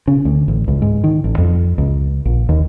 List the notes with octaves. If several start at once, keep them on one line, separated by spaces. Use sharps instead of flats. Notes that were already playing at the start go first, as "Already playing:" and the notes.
C#3
D2
A1
C#2
G#2
D#3
A1
F2
C#2
A#1
D#2